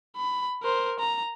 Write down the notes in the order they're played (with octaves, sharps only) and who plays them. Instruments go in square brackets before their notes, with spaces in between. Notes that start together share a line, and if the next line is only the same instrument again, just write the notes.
[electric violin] B5
A#4 C5
A#5